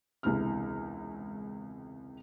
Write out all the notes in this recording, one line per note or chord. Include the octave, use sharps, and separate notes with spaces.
E1 C#2 C3 E3 B5 F6